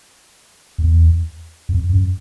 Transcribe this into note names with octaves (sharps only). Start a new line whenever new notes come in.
E2
F2
F#2